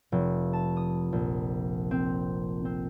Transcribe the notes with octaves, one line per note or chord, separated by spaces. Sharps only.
F1
A5
D#6
A#1
C4
C4